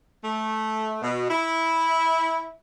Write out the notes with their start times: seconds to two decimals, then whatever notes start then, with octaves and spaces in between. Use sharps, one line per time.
0.24 A3
1.02 B2
1.29 E4